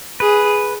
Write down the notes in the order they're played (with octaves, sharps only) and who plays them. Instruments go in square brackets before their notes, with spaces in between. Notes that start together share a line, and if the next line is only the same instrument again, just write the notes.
[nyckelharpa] G#4 [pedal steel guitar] B4